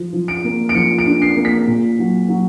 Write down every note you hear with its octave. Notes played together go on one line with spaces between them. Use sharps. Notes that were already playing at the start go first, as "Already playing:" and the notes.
Already playing: F3
F3
D7
A#3
D7
F3 C#7
D7
D4
C7
A#3
B6
A#2
F#3
F#3